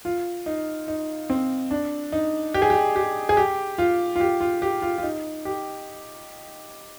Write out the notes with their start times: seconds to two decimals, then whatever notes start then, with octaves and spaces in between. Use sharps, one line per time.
0.05 F4
0.46 D#4
0.88 D#4
1.30 C4
1.71 D4
2.12 D#4
2.54 G4
2.62 G#4
2.70 G4
2.96 G4
3.29 G#4
3.37 G4
3.78 F4
4.16 F4
4.20 G4
4.41 F4
4.62 G4
4.82 F4
4.98 F4
5.03 D#4
5.45 G4